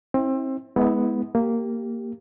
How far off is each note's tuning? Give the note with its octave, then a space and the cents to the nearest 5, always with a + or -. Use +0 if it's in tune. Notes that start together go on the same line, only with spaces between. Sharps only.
C4 +25 E4 -40
G#3 +20 B3 +0 E4 -35
A#3 -10 G4 +0